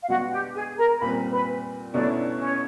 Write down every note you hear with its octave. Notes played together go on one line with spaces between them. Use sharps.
F5
B2 G#3 B3 D4 F#4 F#5
G4 G5
G#4 G#5
A#4 A#5
A#2 G3 C4 B4 B5
B4 B5
B2 F#3 A3 C#4 D4 E4 D5
C#4 C#5